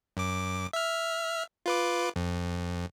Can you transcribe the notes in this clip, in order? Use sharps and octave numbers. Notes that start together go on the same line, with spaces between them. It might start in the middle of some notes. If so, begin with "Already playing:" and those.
F#2 D6
E5 F6
F4 B4 D6
F2